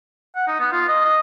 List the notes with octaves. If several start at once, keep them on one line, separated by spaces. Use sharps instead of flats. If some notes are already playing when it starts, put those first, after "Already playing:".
F#5
D#4
B3
F4
D#5
D#5